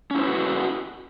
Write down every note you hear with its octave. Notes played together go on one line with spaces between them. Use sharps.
C#4 E4 F#4 B4 C5